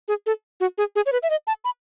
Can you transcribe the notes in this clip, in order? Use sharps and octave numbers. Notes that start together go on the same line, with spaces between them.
G#4
A4
F#4
G#4
G#4
C#5
B4
E5
D#5
A5
B5